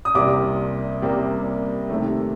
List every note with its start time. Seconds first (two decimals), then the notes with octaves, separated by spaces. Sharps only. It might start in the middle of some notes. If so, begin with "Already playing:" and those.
0.05 D#6
0.15 C2 C3 G3 A#3 D6
1.02 C2 C3 G3 A#3
1.90 C3 D#3 A3